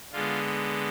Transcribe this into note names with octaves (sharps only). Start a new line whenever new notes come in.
D3 G#3 B3 F4